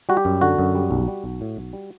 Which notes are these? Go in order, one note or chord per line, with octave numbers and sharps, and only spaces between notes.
G3 F#4
G4
F#2
D3 F#4
F#2
G3
B1
G3
B1
A2
B1
G3